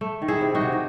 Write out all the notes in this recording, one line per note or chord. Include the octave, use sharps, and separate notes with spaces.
A3
D#3
E4 G#4
C3
D#4 F#4
C3
D#4